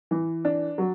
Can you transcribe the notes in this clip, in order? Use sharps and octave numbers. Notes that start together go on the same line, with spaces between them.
E3
D4
F#3